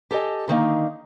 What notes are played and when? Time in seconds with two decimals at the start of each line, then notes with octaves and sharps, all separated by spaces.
0.11 G4 A4 C#5 D#5 G#5
0.48 D3 D#3 A#3 D#4